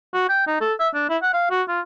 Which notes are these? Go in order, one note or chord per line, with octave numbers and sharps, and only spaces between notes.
F#4
G5
D#4
A4
E5
D4
E4
F#5
F5
F#4
F4